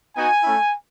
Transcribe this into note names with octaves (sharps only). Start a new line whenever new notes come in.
B3 D#4 F#4 G#5
A3 C#4 E4